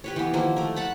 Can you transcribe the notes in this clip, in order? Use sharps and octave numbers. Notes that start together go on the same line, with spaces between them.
G4 B4 C#5
E3 B3
D#3 F3 A#3 E4
A3 A#4
F#5 A5 B5